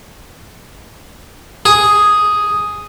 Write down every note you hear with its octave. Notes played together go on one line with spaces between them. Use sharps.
G#4